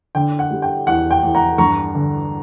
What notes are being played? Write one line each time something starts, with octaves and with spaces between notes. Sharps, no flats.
D3 G5
F#5
G3
G5
E2 F#5
G5
E2
F#5 A#5
G2 A#5 C#6
D3